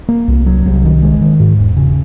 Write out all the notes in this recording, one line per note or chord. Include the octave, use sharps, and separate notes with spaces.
A#3
C2
F#3
C2
D#3
G#3
D#3
G#2
E1
C#3